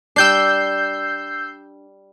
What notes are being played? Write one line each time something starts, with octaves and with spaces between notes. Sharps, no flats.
G3 D4 E6 G6 C7